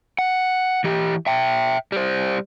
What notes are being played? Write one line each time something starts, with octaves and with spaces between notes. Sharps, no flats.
F#5
E3 G4
E5 G5
G3 C5